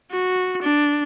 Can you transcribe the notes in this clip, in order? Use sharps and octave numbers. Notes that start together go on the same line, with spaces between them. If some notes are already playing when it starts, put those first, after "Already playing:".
F#4
D4